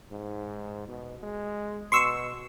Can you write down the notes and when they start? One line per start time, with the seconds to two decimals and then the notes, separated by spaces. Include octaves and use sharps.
0.11 G#2
0.88 B2
1.23 G#3
1.92 B2 C6 C#6 E6